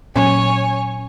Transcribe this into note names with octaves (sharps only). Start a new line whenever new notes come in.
A#2 F#3 C#4 C#5 G#5